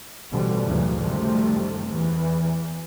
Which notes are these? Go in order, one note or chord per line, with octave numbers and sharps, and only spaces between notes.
A1 B2 D3 E3 F3 G3
G1 D2 A2 C#3 E3 F#3
F#2 C3 D#3 F3 G3 A3
E2 E3